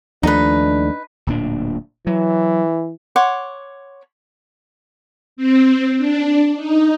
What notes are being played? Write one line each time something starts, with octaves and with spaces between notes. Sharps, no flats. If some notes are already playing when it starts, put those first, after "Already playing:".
D#2 F3 A3 D4 D#4 B4
D1 A#2 D4
E3 F#3
C#5 F#5 C6 D6
C4
D4
D#4